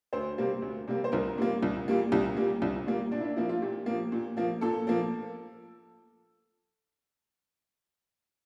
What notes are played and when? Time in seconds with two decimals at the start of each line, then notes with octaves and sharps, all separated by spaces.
0.13 D2 C5
0.38 C3 G3 A#3
0.62 D2
0.88 C3 G3 A#3
1.04 C5
1.12 C2 A#4
1.38 A#2 G3 A#3
1.63 C2
1.88 A#2 G3 A#3
2.12 C2 G4
2.37 A#2 G3 A#3
2.62 C2
2.86 A#2 G3 A#3
3.12 A#2 D4
3.20 E4
3.24 D4
3.36 F3 A#3 E4
3.49 F4
3.61 A#2 G4
3.86 F3 A#3
4.12 A#2
4.37 F3 A#3
4.61 A#2 A4
4.87 F3 A#3